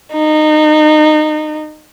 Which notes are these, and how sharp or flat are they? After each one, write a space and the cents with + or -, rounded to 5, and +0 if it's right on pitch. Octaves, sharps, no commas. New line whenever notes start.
D#4 -25